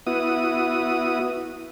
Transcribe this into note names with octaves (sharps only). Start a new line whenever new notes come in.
B3 E4 F#4 D#6